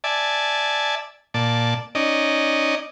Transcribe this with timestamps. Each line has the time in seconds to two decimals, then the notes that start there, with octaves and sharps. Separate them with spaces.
0.04 D5 E5 G#5 A5
1.34 A#2 D5 A5
1.95 C#4 D#4 D5 D#5